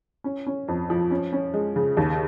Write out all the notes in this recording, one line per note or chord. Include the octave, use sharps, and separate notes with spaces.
C#4
C#4
F2
F3
C#4
C#4
G#3
C#3
D#2